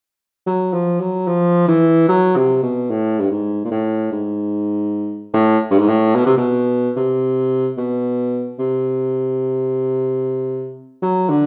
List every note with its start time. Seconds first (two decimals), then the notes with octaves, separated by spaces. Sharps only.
0.46 F#3
0.73 F3
1.00 F#3
1.27 F3
1.68 E3
2.08 F#3
2.36 C3
2.63 B2
2.90 A2
3.20 G2
3.31 G#2
3.65 A#2
3.71 A2
4.12 G#2
5.34 A2
5.70 G2
5.79 G#2
5.88 A2
6.15 B2
6.26 C3
6.37 B2
6.96 C3
7.77 B2
8.59 C3
11.02 F#3
11.30 D3